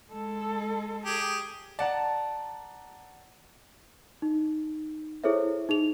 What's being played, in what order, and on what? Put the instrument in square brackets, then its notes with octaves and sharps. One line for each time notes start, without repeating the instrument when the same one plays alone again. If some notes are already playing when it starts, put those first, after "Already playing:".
[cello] G#3 A4
[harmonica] G4 G#4
[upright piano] D5 F#5 A#5 [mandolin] A5
[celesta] D#4
E4 G#4 A4 C5 C#5 E5
D#4 G#4 F7